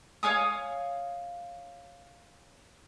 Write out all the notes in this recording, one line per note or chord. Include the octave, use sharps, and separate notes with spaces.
C#5 F5 G#5 D#6